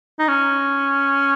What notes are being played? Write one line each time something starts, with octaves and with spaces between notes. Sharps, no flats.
D#4
C#4